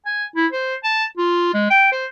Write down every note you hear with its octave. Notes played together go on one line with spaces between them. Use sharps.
G#5
E4
C5
A5
F4
G#3
G5
C5